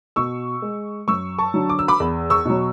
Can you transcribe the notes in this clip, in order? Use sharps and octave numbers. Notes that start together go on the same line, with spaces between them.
B2 C#6 E6
G#3
F#2 C#6 E6
A5 C#6
D3 F#3
D6
E6
B5 D6
E2
C#6 E6
B2 F#3